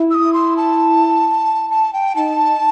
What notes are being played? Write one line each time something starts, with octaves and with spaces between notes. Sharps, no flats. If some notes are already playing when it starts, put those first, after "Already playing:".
Already playing: E4
E6
D#6
C6
A5
A5
G5
D#4 A5